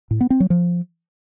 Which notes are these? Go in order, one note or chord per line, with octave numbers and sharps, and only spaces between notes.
A2
B3
C4
F#3
F3